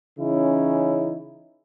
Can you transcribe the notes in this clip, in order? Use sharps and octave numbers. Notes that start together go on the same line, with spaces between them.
C#3 E3 C#4 D#4 E4